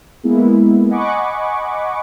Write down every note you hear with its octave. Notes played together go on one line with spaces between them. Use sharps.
G#3 A#3 B3 E4
D#5 F#5 G#5 B5 C#6 D6